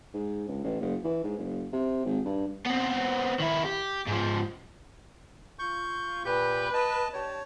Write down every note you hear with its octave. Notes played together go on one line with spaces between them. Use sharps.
G#2
C#2
A1
F#1
E3
G#2
F#1
C3
G#1
G2
B3 C4
D#3 E4
G4
G#2 F3
F4 C#6 G6
A#2 G4 B4 G6
D#5 A5
D4 G4 C#5 A5